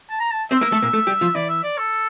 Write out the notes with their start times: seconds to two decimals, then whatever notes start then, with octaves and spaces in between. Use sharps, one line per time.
0.10 A5
0.20 A#5
0.31 A5
0.51 C4 C5 E5
0.61 A#3 A#4
0.72 A3 A4
0.82 A#2 A#3
0.93 A3 A4
1.07 G3 G4
1.21 F3 F4
1.35 E3 E4 D5
1.49 E5
1.63 D5
1.78 A4